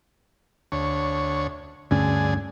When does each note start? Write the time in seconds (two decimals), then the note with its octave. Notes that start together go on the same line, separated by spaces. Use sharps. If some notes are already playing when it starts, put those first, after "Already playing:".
0.72 D2 C#5
1.91 D2 G2 D3 C#4 G#4